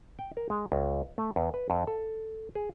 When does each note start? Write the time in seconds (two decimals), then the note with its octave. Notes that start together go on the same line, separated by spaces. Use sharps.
0.19 G5
0.37 A#4
0.50 G#3
0.72 C#2
1.18 A3
1.36 E2
1.54 B4
1.70 F2
1.87 A4
2.55 G#4